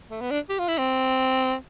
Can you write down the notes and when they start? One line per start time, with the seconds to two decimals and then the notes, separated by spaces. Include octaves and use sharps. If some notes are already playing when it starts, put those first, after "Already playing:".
0.11 A3
0.21 B3
0.31 D4
0.49 G4
0.59 F4
0.68 E4
0.78 C4